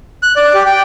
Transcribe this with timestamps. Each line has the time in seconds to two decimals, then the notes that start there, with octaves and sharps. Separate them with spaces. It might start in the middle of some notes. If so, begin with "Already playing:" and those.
0.23 F#6
0.36 D5
0.54 G4
0.66 G5